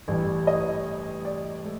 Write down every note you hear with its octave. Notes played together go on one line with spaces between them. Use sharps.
A1 G2 E3 G3
D#5
D5
A3